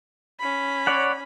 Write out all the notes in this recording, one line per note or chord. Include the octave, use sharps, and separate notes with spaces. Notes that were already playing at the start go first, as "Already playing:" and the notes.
C#4 B5
C#5 D5 F#5